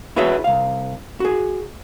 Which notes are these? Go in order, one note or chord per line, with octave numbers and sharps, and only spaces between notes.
E4 F#4 G#4 B4 C#5 E5
C2 F5
F#4 G#4